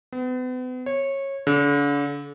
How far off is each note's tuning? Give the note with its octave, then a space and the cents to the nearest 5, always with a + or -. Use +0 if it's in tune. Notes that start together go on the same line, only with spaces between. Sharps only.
B3 +40
C#5 -20
D3 -40